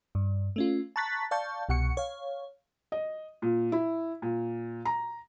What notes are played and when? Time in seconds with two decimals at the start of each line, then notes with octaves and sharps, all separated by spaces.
0.15 G2
0.56 A3 C#4 F4
0.96 A5 A#5 C#6 F#6 A6 B6
1.31 D5 F5 A5 C#6 G6
1.69 C2 B2 F#5 C#6 C#7
1.97 C#5 F5
2.92 D#5
3.42 A#2
3.72 E4
4.22 A#2
4.85 A#5